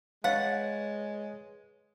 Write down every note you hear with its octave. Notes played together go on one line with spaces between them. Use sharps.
G#3 B4 C#5 F5 F#5 A6